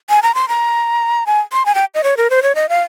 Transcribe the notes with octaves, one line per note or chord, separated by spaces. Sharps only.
G#5
A#5
C6
A#5
G#5
C6
G#5
G5
D#5
C#5
A#4
C5
C#5
D#5
F5